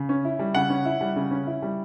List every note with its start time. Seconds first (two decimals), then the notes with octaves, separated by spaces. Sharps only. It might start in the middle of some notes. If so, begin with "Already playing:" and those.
Already playing: C#3
0.09 C#4
0.25 E4
0.39 G3
0.55 C#3 F#5
0.70 C#4
0.85 E4
1.01 G3
1.16 C#3
1.31 C#4
1.47 E4
1.62 G3